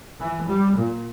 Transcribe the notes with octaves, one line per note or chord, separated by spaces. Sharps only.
E3
G3
A#2